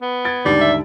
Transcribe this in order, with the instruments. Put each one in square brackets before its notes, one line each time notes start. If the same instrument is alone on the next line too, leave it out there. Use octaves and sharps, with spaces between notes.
[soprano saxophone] B3
[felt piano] G#6 A6 D7
[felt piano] D#2 G#2 D3 [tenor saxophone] G3
[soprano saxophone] E5